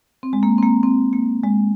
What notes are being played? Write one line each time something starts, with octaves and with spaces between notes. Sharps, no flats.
C4
G#3
A#3
C4
A#3
C4
A#3
G#3